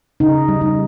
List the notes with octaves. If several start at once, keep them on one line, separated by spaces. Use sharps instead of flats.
C#3 D#4
G3
D#4